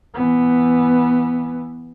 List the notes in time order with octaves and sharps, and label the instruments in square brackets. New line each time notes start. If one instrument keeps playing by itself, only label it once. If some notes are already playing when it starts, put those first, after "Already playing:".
[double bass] E3 B3